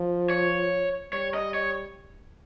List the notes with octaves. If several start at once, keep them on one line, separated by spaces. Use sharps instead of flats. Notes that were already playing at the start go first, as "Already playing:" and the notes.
Already playing: F3
C#5
G3 C#5
D#5
C#5